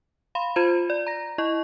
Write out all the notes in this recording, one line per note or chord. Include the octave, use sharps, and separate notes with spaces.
F5 B5 C6
F4 C5 B5 G#6 D#7 E7
D5
A#5 A#6
E4 D#5 C#6